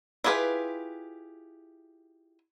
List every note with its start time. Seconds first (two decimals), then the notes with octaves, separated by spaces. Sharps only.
0.24 E4 F4 G4 G#4 B4